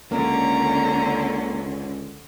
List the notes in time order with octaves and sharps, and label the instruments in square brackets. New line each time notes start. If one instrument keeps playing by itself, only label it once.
[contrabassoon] C#2 [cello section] D3 C#4 [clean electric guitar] A#3 [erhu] A#5